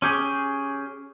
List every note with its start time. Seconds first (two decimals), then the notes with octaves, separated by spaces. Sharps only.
0.02 C#4 G4 G#4